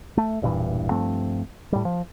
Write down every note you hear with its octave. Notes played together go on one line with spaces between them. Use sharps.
A3
E1 G2 A#2 E3
G2 F3 A3 C4
A2 G3
F3